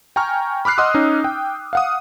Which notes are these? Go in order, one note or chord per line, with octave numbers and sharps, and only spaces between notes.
G5 G#5 A#5 C#6 F6
B5 D6 F6 F#6 C7
D#5 F#5 C6 D#6 E6
C#4 D#4
G5
F5 F#5 D#6